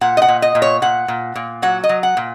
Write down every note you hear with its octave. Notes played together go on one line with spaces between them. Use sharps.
A#2 F#5
D#5
F#5
A#2
D#5
A#2
C#5
A#2 F#5
A#2
A#2
F#3 F#5
D#5
F#3
F#5
A#2